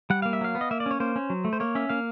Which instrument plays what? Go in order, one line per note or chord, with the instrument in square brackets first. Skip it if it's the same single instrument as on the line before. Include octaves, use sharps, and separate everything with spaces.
[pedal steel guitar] G3 F#5
A#3 F5
E5
F#3 F5
B3
D#5
A#3 E5
D5
C#4 C#5
A#3 C5
C#4
F#3
A3
C5
A#3 C#5
C#4 E5
A#3 F5